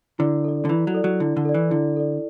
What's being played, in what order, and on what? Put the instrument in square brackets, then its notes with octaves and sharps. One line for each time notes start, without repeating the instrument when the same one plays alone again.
[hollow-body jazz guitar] D3 [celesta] E4
[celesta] A4 D5
[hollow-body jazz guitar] D3
[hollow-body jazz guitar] E3 [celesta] E4
[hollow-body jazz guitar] F#3
[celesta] A4 D5
[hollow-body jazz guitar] F#3
[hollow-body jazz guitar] D3 [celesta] E4
[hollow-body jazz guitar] D3
[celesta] A4 D5
[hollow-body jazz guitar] E3
[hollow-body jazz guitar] D3 [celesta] E4
[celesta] A4 D5